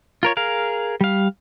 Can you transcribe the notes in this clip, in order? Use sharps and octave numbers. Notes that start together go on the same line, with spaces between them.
F4 A#4 C#5
G#4 A#4 F5
G3 F5